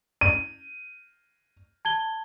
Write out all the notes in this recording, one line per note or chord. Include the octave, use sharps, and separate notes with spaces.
D#7
A5 G#6 G7